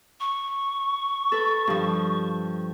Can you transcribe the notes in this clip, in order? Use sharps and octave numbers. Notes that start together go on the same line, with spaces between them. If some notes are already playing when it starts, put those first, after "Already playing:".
C#6
A4 B4
G2 F3